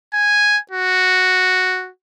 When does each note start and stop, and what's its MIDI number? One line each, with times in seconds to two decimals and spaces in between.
0.14 0.58 80
0.71 1.90 66